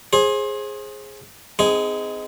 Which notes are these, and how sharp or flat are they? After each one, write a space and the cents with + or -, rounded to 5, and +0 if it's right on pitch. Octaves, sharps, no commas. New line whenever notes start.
G#4 +0 C5 +30
C4 -30 D#4 +15 G#4 -5